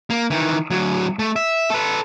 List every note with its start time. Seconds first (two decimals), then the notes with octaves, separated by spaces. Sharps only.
0.10 A#3
0.30 D#3 E3
0.71 D2 F#3
1.19 A3
1.36 E5
1.70 A4 B4